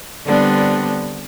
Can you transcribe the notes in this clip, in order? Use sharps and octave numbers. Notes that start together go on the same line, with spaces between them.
D3 G3 B3 C4 D4